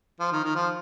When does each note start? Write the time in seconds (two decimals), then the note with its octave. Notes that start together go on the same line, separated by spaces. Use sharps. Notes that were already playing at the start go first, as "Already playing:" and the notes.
0.20 F3
0.32 D#3
0.44 D#3
0.55 F3